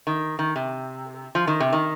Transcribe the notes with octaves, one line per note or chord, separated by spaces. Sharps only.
D#3
D#3
C3
F3
D#3
C3
D#3